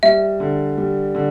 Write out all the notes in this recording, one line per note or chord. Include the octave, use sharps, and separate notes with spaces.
G3 E5
D3
G3
D3